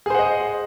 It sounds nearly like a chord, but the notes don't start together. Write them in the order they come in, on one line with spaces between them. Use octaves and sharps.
G#4 C5 F#5 D#5